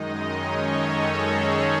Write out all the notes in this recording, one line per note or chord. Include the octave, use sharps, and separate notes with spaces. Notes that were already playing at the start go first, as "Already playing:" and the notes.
Already playing: F#2 D#3 G#3 D#4 D#5
C#4 C#5
A4
G#4